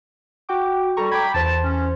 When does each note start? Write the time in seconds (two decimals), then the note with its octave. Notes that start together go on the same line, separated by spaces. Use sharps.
0.49 F#4 G5 D6
0.97 G3 A4 A#5 C#6
1.12 G5 B5 D6 G#6
1.34 E2 C5 A5
1.63 C#4